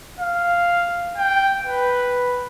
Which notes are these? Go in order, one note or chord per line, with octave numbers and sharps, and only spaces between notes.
F5
G5
B4